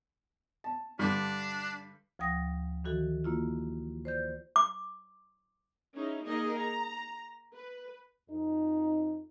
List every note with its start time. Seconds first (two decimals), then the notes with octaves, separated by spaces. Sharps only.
0.64 A5
0.99 G2 D3 D4
2.19 D2 F3 G5 D#6 A#6
2.84 D#3 E3 F#4 A4
3.24 A#3 E4 F4
4.05 C5 D5 G6
4.56 D6
5.93 C#4 D#4 E4 G#4
6.24 A#3 D#4 G#4 A#4 D#5
6.57 A#5
7.53 B4
8.29 F2 D#4